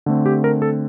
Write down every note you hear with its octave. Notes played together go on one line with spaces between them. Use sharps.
D3 A3 C4
G4
A#4
A4